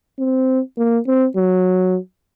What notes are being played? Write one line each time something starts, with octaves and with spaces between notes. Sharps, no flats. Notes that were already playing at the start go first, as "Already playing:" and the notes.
C4
A#3
C4
F#3